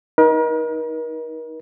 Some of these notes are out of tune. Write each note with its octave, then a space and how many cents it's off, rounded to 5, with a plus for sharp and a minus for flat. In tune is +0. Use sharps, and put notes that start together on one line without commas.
D#4 +15 A#4 +40